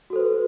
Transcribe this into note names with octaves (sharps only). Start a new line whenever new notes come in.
F#4 A4 B4 C5